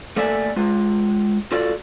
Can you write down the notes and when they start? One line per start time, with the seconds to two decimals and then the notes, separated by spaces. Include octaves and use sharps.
0.16 A3 A#3 A4 D5 E5 G#5
0.56 G#3 F4
1.52 F4 F#4 A4 D5